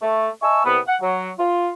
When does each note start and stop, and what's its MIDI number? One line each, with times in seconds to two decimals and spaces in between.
0.02 0.28 57
0.42 0.62 75
0.42 0.62 76
0.42 0.62 80
0.42 0.62 81
0.42 0.62 85
0.42 0.62 88
0.65 0.78 36
0.65 0.78 59
0.87 0.96 78
1.01 1.31 54
1.39 1.70 65